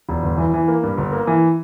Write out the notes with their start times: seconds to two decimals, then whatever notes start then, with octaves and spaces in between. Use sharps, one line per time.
0.09 E1
0.23 G1
0.38 E3
0.54 E3
0.68 A#3
0.83 G2
0.98 G1
1.12 A#3
1.27 E3